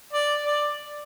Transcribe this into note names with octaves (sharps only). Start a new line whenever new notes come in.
D5
D5